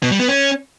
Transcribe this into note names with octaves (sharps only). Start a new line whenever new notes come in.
B2
G3
B3
C#4